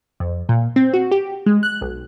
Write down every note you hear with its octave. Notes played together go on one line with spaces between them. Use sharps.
F2
A#2
C4
F#4
G4
G#3
F#6
B1